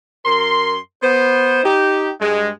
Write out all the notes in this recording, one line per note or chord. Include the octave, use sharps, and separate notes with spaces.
F#2 A#4 C6
B3 C5
D#4 G4
G2 G#3